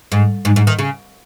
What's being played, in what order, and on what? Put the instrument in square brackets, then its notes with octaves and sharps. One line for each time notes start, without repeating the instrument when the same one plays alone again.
[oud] G#2
G#2
G#2
D#3
C#3